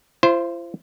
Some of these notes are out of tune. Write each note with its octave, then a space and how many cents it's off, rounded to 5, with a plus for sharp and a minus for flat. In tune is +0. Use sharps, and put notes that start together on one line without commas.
F4 -45 C5 +0